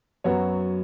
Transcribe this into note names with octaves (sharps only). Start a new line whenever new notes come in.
F#2 F#3 B3 F#4 C#5